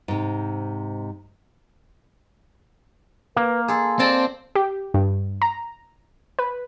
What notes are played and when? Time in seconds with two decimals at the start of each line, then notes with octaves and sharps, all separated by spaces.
0.08 G#2 C3
3.37 A#3 B4
3.68 G#4 A4 C6
3.99 C4 A4 D5 A5
4.55 G4
4.94 G2
5.42 A#5
6.39 B4